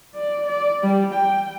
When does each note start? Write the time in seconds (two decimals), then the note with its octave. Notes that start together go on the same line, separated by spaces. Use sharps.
0.15 D5
0.46 D5
0.83 G3
1.14 G5